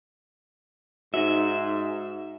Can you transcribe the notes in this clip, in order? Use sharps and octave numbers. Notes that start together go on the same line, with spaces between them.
G#2 D#4 F#4 E5